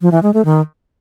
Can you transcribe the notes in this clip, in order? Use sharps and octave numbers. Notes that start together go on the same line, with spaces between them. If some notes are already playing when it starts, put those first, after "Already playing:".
F3
E3
G#3
A3
D#3